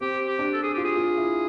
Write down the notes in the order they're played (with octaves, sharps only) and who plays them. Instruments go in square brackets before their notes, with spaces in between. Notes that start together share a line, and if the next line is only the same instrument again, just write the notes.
[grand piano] C4 [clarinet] G4
[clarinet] G4
[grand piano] D4
[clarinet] A4
G#4
[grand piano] F4 [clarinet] G4
[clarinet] G#4
[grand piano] F4
E4